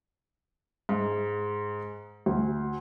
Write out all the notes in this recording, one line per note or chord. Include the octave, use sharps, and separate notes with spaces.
G#2
D2